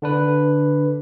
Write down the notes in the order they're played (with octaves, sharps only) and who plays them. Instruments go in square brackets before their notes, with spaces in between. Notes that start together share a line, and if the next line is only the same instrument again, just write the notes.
[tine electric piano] D3 D4 B4